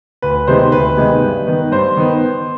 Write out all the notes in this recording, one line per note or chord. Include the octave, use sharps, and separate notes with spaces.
D2 B4
C3 D#3 G#3 B3 C5
D2 B4
C3 D#3 G#3 B3
G2
D#3 B3
G2 C5
D#3 B3